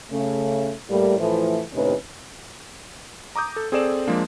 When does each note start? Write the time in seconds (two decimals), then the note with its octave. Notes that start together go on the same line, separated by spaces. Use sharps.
0.11 C#3 A3 C#4
0.89 A2 G3 A#3
1.19 A2 E3 F3 A3
1.74 D#2 A2 C3 C#4 D#4 B4
3.36 A#5 D6 D#6 G6
3.56 A4
3.72 C4 G#4 A4 D5 E7
4.07 F3 G#3 A#3 D4